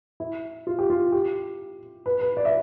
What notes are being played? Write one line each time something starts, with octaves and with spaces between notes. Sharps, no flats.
E4
F4
G4
F4
G4
B4
B4
D5
E5